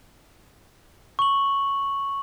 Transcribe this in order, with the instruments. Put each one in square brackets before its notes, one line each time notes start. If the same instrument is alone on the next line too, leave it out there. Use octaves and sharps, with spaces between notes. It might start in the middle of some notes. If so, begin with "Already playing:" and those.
[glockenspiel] C#6 F#7